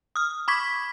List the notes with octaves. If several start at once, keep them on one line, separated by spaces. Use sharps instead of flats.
D#6 F6
B5 C#6 D6 G#6 B6